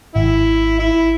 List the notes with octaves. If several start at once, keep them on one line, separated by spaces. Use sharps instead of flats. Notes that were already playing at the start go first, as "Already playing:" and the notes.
G#1 E4
E4